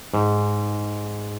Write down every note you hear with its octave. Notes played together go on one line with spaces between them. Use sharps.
G#2